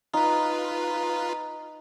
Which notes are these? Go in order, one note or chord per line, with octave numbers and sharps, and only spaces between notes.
D#4 F4 B4